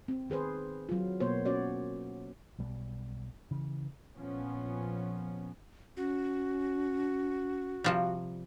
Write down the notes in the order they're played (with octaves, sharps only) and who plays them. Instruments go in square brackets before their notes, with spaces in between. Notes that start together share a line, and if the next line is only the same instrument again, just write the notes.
[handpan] C4
D#3 G#4 B4 C5
F#3 F4
B2 A#3 B3 C5 C#5
C#4 F#4 C#5 D5
[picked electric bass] B1 B2 G3
C#3 E3
[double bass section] A#1 F3 B3 C#4
[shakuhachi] C#4 [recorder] F#4
[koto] C3 F3 G3